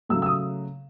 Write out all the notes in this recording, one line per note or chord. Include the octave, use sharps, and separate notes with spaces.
C#3 F#3 A3 E6
E6
D#6